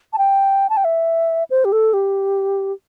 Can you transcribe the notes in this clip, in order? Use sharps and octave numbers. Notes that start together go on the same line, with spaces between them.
A5
G5
A5
G5
E5
C5
G4
A4
G4